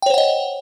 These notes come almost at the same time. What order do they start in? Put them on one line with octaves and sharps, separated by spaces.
G5 C#5 C5 F#5 D#5